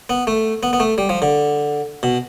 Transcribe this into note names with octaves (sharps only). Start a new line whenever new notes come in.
B3
A3
B3
B3
A3
G3
F3
D3
B2